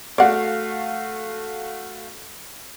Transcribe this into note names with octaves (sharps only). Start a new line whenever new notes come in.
A3 F#4 D5 F5 F#5